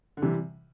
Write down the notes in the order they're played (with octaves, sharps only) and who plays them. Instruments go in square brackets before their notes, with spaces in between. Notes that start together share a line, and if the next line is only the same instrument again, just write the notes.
[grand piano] D3
[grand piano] C3 [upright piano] E3 G3